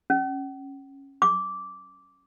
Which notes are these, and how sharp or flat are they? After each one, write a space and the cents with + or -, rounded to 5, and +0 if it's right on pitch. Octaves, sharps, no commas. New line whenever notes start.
C#4 -15
D6 -10